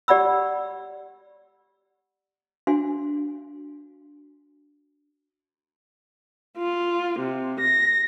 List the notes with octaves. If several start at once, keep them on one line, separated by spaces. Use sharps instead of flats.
G4 D5 F#5 B5 E6
D4 F#4 F5 G#5 C6
F4
C3
A#6